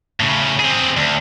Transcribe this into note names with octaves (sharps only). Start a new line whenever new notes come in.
A2 C#3
C4 G#4
D2